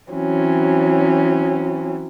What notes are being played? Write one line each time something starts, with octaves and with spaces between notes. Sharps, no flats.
E3 F#3 C4 C#4